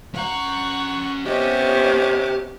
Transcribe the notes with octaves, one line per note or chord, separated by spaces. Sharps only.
C#4 F#5 A#5 C#6
C3 B3 C#4 G4 D#5